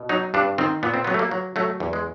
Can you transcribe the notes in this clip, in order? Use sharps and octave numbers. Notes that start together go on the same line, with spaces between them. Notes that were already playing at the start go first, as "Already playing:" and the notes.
Already playing: B2
F#3 D#4
G2 D4
D#3 C4
A#2 B3
C4
B3
F#3
A3
A#3
F#3
F#3 A3
E2
G#3